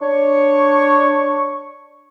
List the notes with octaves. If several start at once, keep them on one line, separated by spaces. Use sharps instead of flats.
D4 C#5 C#6